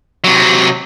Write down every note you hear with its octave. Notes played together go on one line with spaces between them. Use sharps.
C3 F#3